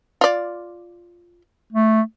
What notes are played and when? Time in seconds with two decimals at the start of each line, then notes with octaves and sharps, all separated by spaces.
0.21 F4 D5
1.73 A3